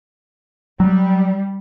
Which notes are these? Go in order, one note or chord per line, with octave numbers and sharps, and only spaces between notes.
F#3 G3